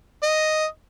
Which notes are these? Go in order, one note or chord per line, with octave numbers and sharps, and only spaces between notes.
D#5